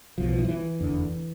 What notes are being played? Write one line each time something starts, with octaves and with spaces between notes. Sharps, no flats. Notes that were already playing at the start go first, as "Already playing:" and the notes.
B1 B2 F3
F3
E3
F3
E3
F1 E2 D3